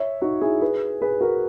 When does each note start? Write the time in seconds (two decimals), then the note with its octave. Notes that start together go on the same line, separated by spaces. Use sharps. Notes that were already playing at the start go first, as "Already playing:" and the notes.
Already playing: C#5 E5
0.21 D#4 F#4
0.41 E4 G#4
0.61 G#4 B4
1.02 G#4 B4
1.21 F#4 A#4